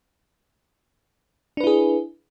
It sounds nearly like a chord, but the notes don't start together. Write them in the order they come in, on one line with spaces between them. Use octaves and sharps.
D4 B4 E4 G#4